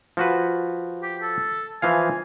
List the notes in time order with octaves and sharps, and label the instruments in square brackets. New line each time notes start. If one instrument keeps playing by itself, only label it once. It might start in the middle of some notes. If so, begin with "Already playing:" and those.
[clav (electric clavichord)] F3 F#4 B4
[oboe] G4
A4
[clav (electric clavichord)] E3 F3 F5 [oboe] G#5